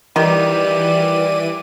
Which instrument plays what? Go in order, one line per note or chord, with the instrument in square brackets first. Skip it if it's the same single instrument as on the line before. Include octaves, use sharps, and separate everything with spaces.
[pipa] D#3 [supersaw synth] E3 D#7 [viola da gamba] G3 F#4 G4 [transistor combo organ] D5